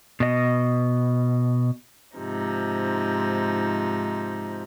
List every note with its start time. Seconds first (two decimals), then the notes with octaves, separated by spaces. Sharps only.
0.20 B2 D#5
2.17 G#2 C3 F3 D#4